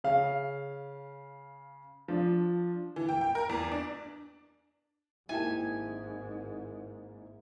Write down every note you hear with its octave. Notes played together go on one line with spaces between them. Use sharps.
C#3 F5
F3 D4
E3
G5
G5
A#4
E2
D4
G#1 G#2 A#3 D#4 E4 G4 G#5 A5